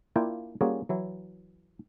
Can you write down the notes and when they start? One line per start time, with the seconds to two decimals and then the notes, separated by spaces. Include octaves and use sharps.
0.16 A#3 D4 E4 F4 G5
0.61 G3 A#3 C#4 F4 F#4 G#4
0.89 E3 F#3 E4